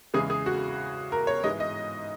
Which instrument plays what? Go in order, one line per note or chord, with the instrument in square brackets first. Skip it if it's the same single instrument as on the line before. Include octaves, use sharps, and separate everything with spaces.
[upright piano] E2 C#3 E3 G#3 G#4
G#4
F#4
A#4
C#5
G#2 E3 G#3 B3 D#5
D#5